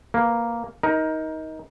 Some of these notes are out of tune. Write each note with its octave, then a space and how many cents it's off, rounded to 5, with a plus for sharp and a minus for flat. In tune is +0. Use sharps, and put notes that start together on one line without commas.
A#3 +0 B4 +0
D#4 +20 A#4 +15